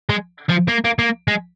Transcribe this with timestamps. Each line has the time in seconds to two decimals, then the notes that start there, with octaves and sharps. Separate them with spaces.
0.09 G#3
0.49 F3
0.68 A#3
0.84 A#3
0.99 A#3
1.28 G#3